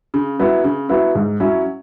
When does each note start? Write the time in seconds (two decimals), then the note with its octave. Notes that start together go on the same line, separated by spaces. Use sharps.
0.14 C#3
0.39 F#3 B3 E4
0.64 C#3
0.89 F#3 B3 E4
1.15 G#2
1.40 F#3 C#4 E4